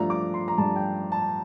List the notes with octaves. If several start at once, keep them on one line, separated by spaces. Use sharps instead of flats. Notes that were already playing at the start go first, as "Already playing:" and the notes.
Already playing: G2 F3 A3 D4 A#5
D6
C6
A#5
G2 F3 A3 D4 A5
G5
A5